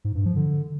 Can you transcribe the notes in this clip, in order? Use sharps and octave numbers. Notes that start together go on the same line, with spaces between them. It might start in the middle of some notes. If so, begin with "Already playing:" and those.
G#2
G2
F3
D3